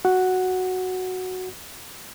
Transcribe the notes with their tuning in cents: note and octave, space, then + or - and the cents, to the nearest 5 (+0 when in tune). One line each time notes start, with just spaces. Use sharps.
F#4 +0 F#5 +0